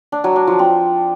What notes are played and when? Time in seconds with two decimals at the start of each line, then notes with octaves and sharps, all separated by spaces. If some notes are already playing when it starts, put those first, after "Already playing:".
0.12 D4
0.24 F#3
0.36 D4
0.47 F3
0.59 C4